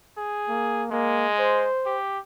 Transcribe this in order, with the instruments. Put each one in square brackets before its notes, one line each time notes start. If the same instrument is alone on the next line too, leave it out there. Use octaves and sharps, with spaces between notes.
[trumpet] G#4
[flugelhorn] A#3
[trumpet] G#3 [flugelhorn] A#3
[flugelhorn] C5
[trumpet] G4